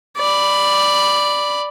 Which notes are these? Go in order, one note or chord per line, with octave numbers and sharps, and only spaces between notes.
D5 B5